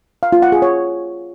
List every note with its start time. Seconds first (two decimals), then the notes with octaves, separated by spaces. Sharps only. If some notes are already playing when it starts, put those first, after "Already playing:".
0.23 F5
0.32 F4
0.42 F#5
0.52 G#4
0.62 C#5